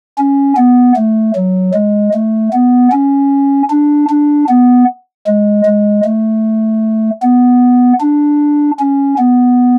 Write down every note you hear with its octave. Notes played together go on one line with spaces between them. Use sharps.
C#4
B3
A3
F#3
G#3
A3
B3
C#4
D4
D4
B3
G#3
G#3
A3
B3
D4
C#4
B3